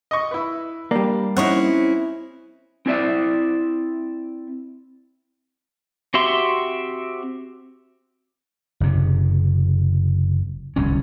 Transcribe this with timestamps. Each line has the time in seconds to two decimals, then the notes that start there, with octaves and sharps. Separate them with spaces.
0.11 D#5 C#6
0.31 E4 B4
0.91 G3 A#3 D4
1.37 C4 C#4 D#4 E4 C#5 F#5
2.86 C4 E4 D5 E5
6.14 C4 F#4 G4 E5 C6
8.80 F#1 C3
10.76 D1 C2 A2 C#4